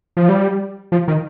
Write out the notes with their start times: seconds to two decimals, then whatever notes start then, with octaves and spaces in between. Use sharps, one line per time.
0.17 F3
0.29 G3
0.92 F3
1.08 D#3